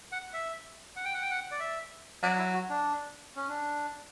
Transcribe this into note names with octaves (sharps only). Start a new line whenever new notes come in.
F#5
E5
F#5
G5
F#5
G5
F#5
D5
E5
F#3 D5
E4
F#4
D4
C#4
D4